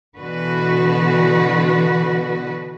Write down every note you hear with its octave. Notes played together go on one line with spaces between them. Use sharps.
B2 D3 E3 F#4 B4